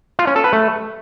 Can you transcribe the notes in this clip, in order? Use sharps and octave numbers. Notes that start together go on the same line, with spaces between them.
F4
C#4
A4
B4
A3